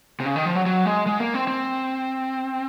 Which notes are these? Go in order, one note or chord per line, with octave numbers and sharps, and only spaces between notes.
C3
C#3
D#3
F3
F#3
F#3
G#3
G#3
A#3
C4
C4